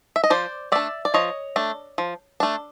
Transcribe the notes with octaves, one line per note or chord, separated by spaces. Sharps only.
E5
D#5
F3 C5 D5
A3 D4 D5 E5
D5
F3 C#5 D#5
A3 D4
F3
A3 D4